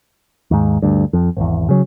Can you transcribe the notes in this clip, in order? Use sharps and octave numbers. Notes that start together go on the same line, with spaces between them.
D#2 G#2
D2 G2
F2
G#1 E2
C#3 F#3